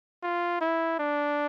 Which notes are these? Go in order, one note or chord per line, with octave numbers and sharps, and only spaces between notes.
F4
E4
D4